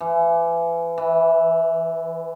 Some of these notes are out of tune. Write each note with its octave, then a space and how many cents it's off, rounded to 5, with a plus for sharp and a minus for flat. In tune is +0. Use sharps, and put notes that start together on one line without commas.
E3 +30
E3 -5